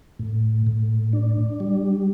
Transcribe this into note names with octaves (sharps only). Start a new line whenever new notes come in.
A2
A2
D4
G3